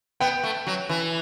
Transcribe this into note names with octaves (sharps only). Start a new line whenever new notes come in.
B3 G5
A3
F#3
E3